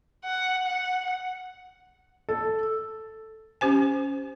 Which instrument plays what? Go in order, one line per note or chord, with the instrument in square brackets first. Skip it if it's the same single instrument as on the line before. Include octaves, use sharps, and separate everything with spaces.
[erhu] F#5
F#5
[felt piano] A4
[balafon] C#4 G4 C5 G#5